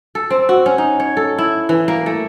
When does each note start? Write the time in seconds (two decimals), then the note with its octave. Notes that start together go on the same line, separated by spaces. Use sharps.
0.15 A4
0.30 C4
0.49 F#4
0.66 C#4
0.78 D#4
1.00 C#5
1.17 A4
1.38 E4
1.69 E3
1.88 A#3
2.06 A3